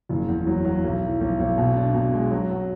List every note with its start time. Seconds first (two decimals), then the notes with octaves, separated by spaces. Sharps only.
0.09 F#1
0.28 E2
0.47 F#3
0.65 F#3
0.84 B1
1.02 E3
1.20 B1
1.39 B1
1.58 B2
1.76 D4
1.94 B2
2.13 G#3
2.31 F#3
2.50 F#3